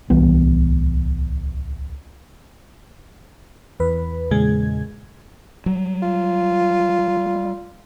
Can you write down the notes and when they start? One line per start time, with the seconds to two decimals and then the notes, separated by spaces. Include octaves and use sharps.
0.10 D1 C2 E3 B3
3.80 E2 B4
4.31 E2 A#2 C#3 G#3 G#6
5.66 F#3 G3
6.03 F4